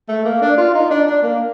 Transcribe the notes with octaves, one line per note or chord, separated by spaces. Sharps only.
A3
A#3
D4
F4
D#4
D4
D4
A#3